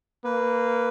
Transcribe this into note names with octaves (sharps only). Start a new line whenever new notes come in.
A#3 B4